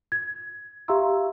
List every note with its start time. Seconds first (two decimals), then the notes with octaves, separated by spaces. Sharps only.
0.12 G#6
0.88 G4 E5 F5 A#5 C6 E6